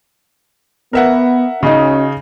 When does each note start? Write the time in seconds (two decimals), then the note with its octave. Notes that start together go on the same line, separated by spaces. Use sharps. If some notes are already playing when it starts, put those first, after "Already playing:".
0.93 B3 A#4 E5 F#5
1.63 C#3 C#4 D#4 F#4 D#5